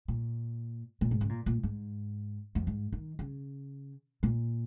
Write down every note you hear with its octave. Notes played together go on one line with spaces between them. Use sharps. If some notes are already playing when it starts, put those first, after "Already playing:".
A#2
A#2
G#2
C#3
A#2
A#2
G#2
F2
G#2
D#3
C#3
A#2